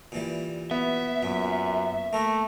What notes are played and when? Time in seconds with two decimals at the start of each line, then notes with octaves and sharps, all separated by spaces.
0.12 A#2 E3 G3
0.71 B3 E5
1.23 F#2 A#2
2.13 A3 A#3 A#4